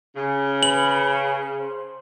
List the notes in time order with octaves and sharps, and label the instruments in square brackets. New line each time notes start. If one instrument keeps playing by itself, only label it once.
[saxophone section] C#3 [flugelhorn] G#4
[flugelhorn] B4 [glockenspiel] F#7
[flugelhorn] G#4
C5